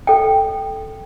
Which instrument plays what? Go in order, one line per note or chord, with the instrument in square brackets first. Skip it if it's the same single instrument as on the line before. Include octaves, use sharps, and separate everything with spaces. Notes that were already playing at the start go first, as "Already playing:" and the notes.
[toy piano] A4 G5